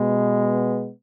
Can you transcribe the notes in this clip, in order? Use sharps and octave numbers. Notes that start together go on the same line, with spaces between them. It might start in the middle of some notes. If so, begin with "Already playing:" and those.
Already playing: B2 G#3 B3